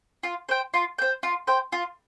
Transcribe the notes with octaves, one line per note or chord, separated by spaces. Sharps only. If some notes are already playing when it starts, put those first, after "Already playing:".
F4
C5 G5
F4
C5 G5
F4
C5 G5
F4